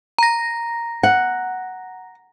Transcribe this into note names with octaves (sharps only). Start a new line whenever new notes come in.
A#5 A#6
F#5